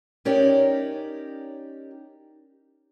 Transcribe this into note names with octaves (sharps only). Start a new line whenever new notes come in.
C#4 D#4 G4 A#4 C#5 D5